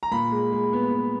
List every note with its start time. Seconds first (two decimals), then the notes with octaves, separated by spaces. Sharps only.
0.03 A#5
0.11 A#2 B5
0.31 G#3
0.52 G#3
0.73 B3
0.93 B3